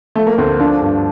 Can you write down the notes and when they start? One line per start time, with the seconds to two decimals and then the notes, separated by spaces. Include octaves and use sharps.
0.15 F3 A3
0.27 A#3
0.38 D2 C4
0.60 F3 D4
0.81 G2